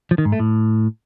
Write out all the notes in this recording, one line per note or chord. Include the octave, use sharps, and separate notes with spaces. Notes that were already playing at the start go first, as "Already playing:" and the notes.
F3
D#3
G#2
A3
A2